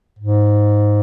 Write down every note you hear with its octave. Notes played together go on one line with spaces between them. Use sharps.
G#2